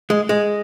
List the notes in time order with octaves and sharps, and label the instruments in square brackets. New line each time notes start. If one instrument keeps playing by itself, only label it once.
[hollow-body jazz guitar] G#3
G#3